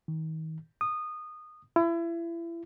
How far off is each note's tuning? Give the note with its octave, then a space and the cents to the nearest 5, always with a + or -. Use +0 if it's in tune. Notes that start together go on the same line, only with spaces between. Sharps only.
D#3 +35
D#6 -20
E4 +30